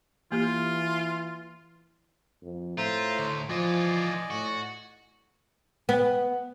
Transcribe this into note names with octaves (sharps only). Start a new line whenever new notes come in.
E3 A#3 F4 G4
F2
A2 F4 C5 E5 A#5
D2
E3 F3 F4 D5 D#5 G#5
A2 F#4
B3